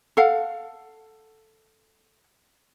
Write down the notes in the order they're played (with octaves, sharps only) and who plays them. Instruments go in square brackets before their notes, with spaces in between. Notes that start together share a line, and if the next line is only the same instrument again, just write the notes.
[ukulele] A4 F5 F#5